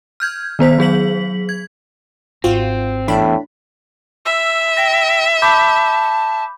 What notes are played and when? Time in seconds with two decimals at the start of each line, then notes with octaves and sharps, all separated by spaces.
0.20 F6 G6 G#6
0.59 D#3 B3 C5 B6
0.78 F#3 G#4 B6 F#7
1.49 G#6
2.44 G#1 C4 F4 F#4
3.08 E2 A2 D4 B5
4.25 E5 E6
4.77 G5 A#6
5.42 A5 B5 D6 G6